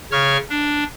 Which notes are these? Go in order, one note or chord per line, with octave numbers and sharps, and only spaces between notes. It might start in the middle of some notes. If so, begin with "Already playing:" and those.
C#3 C#5 C#6 F6
D4